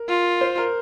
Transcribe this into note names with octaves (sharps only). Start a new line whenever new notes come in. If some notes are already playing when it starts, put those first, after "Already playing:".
Already playing: A#4
F4
C5
A#4